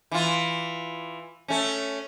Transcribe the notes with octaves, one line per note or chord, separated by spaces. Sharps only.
E3 F4
A3 C#4